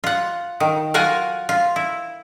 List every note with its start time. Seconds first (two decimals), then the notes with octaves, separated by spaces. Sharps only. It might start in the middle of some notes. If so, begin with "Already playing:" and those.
0.04 F4 F#5
0.60 D#3
0.94 F#3 F4 A#4 F#5 G#5
1.49 F4
1.76 E4